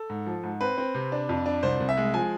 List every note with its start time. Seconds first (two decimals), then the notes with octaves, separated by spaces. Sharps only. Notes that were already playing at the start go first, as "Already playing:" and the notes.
Already playing: A4
0.10 G#2
0.26 F3
0.43 G#2
0.61 C4 B4
0.78 C4
0.95 C3
1.12 D4
1.29 F2
1.46 D4
1.63 C2 C5
1.80 C2
1.89 E5
1.97 G#3
2.14 F3 G#5